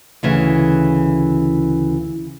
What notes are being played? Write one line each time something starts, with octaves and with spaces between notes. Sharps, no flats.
D2 C#3 E3